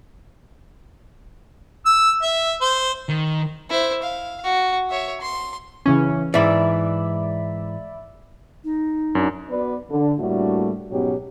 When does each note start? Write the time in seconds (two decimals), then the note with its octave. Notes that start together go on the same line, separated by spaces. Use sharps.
1.86 E6
2.22 E5
2.61 C5
3.09 D#3
3.70 E4 C5
4.03 F5
4.44 F#4
4.90 C#5 E5
5.21 C6
5.86 C#3 E3 C#4
6.34 G#2 E3 D5 E5 B5
8.64 D#4
9.15 F#2 D4
9.49 B3 F#4 B4 D5
9.90 D3
10.19 A2 G3 A3 A#3 D4 F#4
10.91 G#2 B2 F#3 B3 C#4 G4